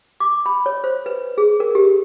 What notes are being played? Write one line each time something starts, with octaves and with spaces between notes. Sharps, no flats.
D6
B5
C#5
C5
B4
G#4
A#4
G4